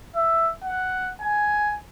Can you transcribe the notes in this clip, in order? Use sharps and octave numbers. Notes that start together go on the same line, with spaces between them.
E5
F#5
G#5